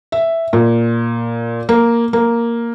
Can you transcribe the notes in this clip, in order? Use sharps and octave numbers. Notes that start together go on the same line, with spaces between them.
E5
A#2
A#3
A#3